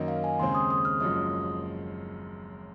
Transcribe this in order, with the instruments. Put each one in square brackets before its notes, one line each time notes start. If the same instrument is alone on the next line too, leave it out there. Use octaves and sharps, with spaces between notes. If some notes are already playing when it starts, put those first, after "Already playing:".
Already playing: [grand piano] F#2 D#3 A#3 D#4
[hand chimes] F5
G#5
[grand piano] D#2 C#3 G#3 C4 [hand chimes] C6
[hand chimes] D#6
D#6
F6
[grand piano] F#1 F#2 F3 G#3 [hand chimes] D#6